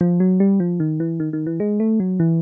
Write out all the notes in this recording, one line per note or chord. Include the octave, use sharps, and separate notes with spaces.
F3
F#3
G3
F3
D#3
E3
D#3
D#3
E3
G#3
A3
F#3
E3